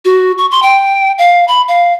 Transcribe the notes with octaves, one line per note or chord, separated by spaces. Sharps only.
F#4
C#6
C6
G5
F5
B5
F5